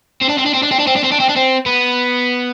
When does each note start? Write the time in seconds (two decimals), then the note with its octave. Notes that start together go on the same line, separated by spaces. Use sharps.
0.22 C4
0.29 D4
0.38 C4
0.46 D4
0.54 C4
0.63 D4
0.72 C4
0.79 D4
0.87 C4
0.96 D4
1.04 C4
1.12 D4
1.20 C4
1.29 D4
1.37 C4
1.66 B3